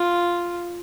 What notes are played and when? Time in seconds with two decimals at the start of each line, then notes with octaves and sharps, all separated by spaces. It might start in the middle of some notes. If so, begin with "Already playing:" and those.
Already playing: F4